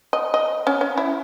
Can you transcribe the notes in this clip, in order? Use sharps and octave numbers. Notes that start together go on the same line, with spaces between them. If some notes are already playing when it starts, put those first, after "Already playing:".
D#5
D#5
C#4
C#4
E4